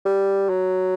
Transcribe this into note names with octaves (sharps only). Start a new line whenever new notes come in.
G3
F#3